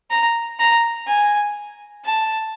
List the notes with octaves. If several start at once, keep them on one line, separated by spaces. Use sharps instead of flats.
A#5
A#5
G#5
A5